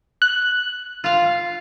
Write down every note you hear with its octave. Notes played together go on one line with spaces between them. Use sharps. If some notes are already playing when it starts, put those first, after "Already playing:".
F#6
F4 F5